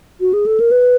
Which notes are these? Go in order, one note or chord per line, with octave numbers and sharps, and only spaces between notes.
F#4
G#4
A4
A#4
B4